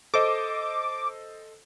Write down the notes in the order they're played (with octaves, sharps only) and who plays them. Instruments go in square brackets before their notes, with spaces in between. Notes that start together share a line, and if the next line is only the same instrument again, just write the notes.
[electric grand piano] A4 C5 D#5 [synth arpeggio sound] D6